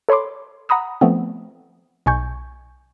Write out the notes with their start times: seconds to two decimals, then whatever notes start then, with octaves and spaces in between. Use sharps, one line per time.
0.09 A4 C#5 B5 C6 D6
0.69 F#5 A#5 B5 D#6 E6
1.01 F3 A3 B3 C4
2.06 B1 B2 G#5 C#6 G6